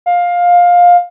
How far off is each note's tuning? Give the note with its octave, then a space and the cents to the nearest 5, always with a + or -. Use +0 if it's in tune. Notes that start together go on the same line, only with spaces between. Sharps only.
F5 +15